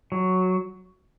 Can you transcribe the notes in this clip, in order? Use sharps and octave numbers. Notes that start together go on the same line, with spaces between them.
F#3